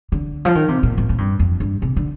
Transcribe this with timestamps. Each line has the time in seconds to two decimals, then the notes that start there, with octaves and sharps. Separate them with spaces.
0.12 D3
0.45 F3
0.55 D#3
0.68 C3
0.83 A#2
0.98 A2
1.09 A2
1.18 G2
1.39 F2
1.60 G2
1.82 C3
1.97 D3